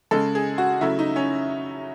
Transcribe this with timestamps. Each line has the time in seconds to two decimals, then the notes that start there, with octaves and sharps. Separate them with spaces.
0.11 C#3 G#3 A4
0.35 G#4
0.58 F#4
0.81 C#3 F#3 A3 E4
0.99 D#4
1.16 C#4